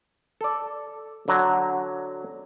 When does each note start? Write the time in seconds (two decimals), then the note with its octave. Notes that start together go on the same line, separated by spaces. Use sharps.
0.41 A4 D5
1.28 D3 F#3 A#5